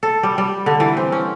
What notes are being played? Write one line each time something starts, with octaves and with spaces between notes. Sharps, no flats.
A4
G3
G3
D3
E3
C4
C#4